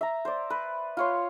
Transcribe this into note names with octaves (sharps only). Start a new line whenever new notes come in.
E5 A#5
C5 D5
B4
F4 C#5 C6